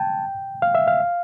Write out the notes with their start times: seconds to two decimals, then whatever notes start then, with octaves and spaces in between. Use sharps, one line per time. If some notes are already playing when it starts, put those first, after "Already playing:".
Already playing: G5 A5
0.62 F5
0.75 E5
0.88 F5